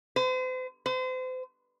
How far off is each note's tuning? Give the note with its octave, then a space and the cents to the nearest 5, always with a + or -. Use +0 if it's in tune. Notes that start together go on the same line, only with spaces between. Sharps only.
C5 -40
C5 -35